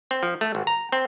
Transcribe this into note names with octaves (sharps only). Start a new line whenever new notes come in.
C4
F3
A3
G#1
A#5
C4